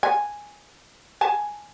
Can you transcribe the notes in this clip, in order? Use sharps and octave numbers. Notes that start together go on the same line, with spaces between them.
G#5
G#5 A5